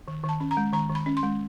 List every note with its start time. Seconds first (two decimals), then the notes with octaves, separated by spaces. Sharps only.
0.08 D#3
0.23 D#3
0.29 A5
0.40 C#4
0.51 A#5
0.57 G#3
0.73 D#3 A#5
0.90 D#3
0.95 B5
1.06 C#4
1.17 C6
1.23 G#3